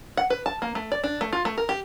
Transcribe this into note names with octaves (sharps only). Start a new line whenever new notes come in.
F#5
B4
A5
A#3
A3
D5
D4
A3
F4
A3
A#4
G4